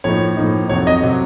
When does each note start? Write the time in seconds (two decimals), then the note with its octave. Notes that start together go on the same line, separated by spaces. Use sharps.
0.04 A2 F3 A#3 D#4 C#5
0.37 A2 F3 A#3 D#4
0.69 F2 C3 F#3 C#5
0.87 D#5
1.03 C3 F#3